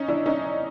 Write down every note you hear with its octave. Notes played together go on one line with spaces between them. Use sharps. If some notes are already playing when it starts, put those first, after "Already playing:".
Already playing: C#4 D#4
D4 E4
C#4 D#4